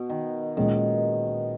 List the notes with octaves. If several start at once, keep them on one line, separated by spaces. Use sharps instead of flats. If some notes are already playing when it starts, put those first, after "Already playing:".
Already playing: B2
D#3
A#2 D#3 G#3 C#4